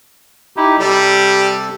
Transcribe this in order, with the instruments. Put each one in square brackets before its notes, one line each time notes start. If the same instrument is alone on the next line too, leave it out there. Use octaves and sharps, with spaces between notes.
[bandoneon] D#4 E4 G4
[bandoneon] C3 A4 [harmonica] G3